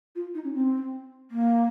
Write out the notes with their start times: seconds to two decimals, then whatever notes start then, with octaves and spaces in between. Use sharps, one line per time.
0.16 F4
0.35 D#4
0.44 C#4
0.54 C4
1.31 A#3